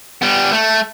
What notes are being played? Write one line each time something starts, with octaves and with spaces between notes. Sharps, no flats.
G3 B3
A3